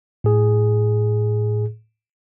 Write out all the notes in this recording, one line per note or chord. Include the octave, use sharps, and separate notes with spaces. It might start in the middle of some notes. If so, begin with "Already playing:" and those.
A2 G#4